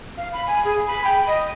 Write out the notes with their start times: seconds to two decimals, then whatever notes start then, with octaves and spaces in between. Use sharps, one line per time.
0.17 F5
0.33 B5
0.47 G#5
0.65 G#4
0.87 B5
1.04 G5
1.27 D#5